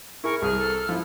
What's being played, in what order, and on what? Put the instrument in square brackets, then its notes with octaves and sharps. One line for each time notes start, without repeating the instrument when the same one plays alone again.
[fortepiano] E4 G#4 [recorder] A#4 [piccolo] C#6
[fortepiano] C2 [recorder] G#4 [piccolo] F6
[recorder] A4
[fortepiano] F3 E4